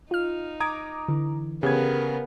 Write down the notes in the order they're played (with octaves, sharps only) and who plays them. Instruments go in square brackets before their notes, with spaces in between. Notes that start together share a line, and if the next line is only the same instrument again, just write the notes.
[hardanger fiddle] D#4 [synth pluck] F4 F6
[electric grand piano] A#5 D#6 G#6 [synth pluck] D6
[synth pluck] D3 E3
[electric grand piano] C#3 G#6 [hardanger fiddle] B3 A#4 [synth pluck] G4